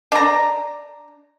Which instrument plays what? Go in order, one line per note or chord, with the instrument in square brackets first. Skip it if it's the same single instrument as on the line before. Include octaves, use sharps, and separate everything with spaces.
[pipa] D4 A#5